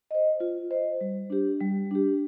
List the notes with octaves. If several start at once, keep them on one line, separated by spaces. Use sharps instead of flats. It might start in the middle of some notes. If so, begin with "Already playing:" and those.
C5 D#5
F4
C5 D#5
G3
D4 G4
G3
D4 G4